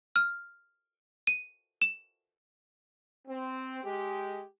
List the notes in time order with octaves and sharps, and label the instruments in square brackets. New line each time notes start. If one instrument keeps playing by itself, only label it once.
[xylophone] F6
D#7
E7
[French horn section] C4
G#3 G4